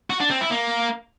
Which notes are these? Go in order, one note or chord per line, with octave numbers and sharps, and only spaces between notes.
F#4
D4
C4
E4
A#3